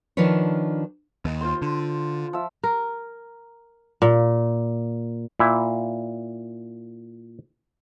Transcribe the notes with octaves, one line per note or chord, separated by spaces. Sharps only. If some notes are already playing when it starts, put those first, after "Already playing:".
D#3 F3 D4 A#4 B4 C#5
D#2
F4 C5 C6
D3
F3 E5
A#4
A#2
A#2 E4